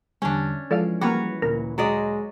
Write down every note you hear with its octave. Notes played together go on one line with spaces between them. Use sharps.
E2 D3 G3 C#4 D4
E3 F3 G#3 A4 D5 F5
G3 A#3 F#4 B4 C#5
D2 A#2 A#3 A#4
F#3 G#3 D5 D#5